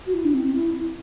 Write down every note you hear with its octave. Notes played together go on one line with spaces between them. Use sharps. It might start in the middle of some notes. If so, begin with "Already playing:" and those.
F#4
E4
D4
C4
C4
E4